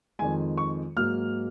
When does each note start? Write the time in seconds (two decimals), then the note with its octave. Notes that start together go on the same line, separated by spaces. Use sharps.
0.19 F2 D#3 G#3 G#5
0.58 C#6
0.96 G#2 F#3 A#3 F6